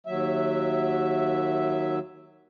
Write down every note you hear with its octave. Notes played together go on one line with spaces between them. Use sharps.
D#2 F#3 E5